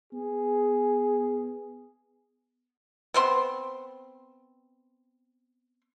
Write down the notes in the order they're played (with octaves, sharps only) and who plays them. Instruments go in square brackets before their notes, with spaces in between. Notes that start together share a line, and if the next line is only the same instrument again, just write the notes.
[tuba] B3 [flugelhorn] G#4
[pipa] B3 C4 C6